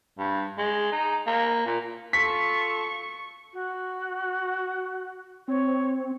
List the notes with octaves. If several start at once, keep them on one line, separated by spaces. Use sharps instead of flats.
G2
G#3
D#4
A#3
A#2
F4 A4 C#6 B6
F#4
C4 C#5